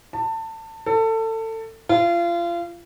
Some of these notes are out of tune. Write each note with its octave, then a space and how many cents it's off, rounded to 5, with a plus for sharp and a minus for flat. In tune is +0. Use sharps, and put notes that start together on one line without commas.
A5 +25
A4 +25
F4 -30